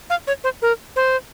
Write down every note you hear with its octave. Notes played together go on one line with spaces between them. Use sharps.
F5
C#5
C5
A#4
C5